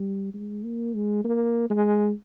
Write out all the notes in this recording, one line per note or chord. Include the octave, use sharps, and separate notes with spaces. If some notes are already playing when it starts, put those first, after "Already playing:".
Already playing: G3
G#3
A#3
G#3
A#3
G#3